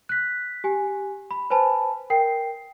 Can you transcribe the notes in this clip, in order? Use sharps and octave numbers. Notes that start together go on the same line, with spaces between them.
F#6 B6
G4 G#5
B5
B4 C5 G#5 A5 B5
A#4 G5 C7